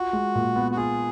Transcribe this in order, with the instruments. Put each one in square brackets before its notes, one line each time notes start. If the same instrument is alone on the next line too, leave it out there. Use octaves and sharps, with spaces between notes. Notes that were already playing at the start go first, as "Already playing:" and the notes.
Already playing: [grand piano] F4 [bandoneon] F#4
[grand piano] G#3
A#2
B3
[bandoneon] F#4
[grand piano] F4 [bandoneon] G#4